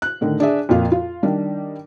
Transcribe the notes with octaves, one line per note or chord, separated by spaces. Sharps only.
F#6
A2 D3 D#3
D4 G#4 E5
F2 A#2 F4
F4
D#3 G3 D4